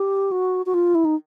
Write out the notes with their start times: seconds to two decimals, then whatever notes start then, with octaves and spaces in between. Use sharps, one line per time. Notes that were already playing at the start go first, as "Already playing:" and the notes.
Already playing: G4
0.32 F#4
0.66 F#4
0.74 F4
0.95 E4
1.05 D#4